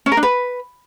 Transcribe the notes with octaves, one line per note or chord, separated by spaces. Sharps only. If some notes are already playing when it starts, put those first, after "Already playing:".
C#4
A#4
D4
B4